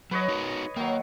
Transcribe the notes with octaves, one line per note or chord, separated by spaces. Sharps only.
F#3 B4 C#5 D#5
D#4 F#4 A#4
D#3 F#3 A#3